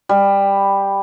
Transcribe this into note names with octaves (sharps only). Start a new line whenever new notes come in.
G3